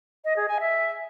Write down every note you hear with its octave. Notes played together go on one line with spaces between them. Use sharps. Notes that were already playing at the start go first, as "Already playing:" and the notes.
D#5
G#4
G#5
E5